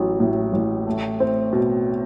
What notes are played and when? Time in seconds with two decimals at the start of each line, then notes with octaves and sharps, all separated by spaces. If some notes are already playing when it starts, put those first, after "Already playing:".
Already playing: A1 F#3
0.20 A2
0.53 A1
0.87 A3
1.20 C4
1.53 B2